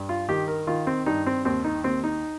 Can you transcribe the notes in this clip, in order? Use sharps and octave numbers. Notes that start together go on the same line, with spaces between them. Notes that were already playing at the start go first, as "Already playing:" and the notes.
Already playing: G2
F4
D#3 G4
A#4
D#3 F4
C4
G2 D#4
C4
D#2 C4
D#4
D#2 C4
D#4